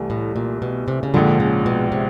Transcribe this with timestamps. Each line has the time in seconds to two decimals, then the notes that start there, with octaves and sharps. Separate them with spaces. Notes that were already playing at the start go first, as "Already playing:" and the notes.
Already playing: C2 C3 E3 A3
0.10 A2
0.36 A#2
0.62 B2
0.88 C3
1.03 C#3
1.14 A#1 G#2 D3 F3
1.40 C#3
1.66 B2
1.92 C3